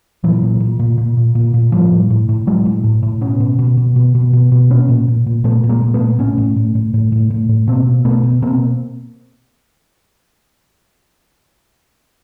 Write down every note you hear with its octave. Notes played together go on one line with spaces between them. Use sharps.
A#2 E3 F#3
A#2
A#2
A#2
A#2
A#2
A#2
A#2
A2 F3 G3
A2
A2
A2
A2 F#3 G#3
A2
A2
A2
B2 B3 C#4
B2
B2
B2
B2
B2
B2
B2
A#2 B3 C#4
A#2
A#2
A#2
A#2 A3 B3
A#2
G#3 A#3
A#2
A3 B3
A#2
A2 B3 C#4
A2
A2
A2
A2
A2
A2
A2
B2 A#3 C4
B2
B2 A3 B3
B2
B2 A#3 C4